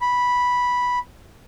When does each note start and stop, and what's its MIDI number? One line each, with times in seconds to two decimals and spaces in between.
0.01 0.99 83